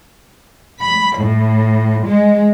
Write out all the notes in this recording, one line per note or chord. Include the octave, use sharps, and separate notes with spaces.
B5
A2
G#3